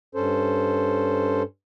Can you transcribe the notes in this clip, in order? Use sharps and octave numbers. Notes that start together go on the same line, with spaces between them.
G2 C#4 A4 C5